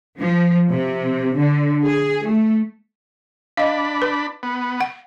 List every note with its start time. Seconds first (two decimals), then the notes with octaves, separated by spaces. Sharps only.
0.20 F3
0.69 C3
1.36 D3
1.84 G#4
2.25 A3
3.57 D4 D#5 F5 B5
4.02 B4
4.43 B3
4.81 F#5